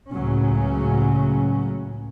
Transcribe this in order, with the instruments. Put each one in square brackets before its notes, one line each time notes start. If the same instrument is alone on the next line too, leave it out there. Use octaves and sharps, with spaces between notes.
[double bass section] C#2 A2 C#3 F#3 C#4